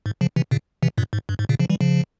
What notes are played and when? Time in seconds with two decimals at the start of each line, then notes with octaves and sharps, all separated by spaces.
0.06 G#2
0.21 C#3 F3
0.36 C3 E3
0.51 A#2 C#3
0.83 C3 E3
0.98 G2 A#2
1.13 G#2
1.29 G2
1.39 G#2
1.49 A#2 C#3
1.59 C#3 F3
1.70 E3 G3
1.81 C#3 F3